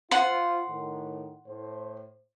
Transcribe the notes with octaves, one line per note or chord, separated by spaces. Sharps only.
F4 C5 F#5 C6
A2 D#3
A2 C5